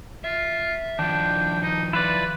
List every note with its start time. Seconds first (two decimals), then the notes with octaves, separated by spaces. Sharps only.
0.24 F4 E5
0.99 D#3 F3 D4 G5
1.63 D#4
1.93 E4 F4 B4 D5